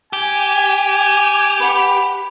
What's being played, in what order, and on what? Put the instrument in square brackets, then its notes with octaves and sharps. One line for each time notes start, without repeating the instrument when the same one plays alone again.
[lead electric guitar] G4 [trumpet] G#5
[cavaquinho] B4 F#5 B5